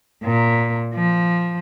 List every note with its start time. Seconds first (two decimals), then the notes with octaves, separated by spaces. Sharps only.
0.24 A#2
0.94 F3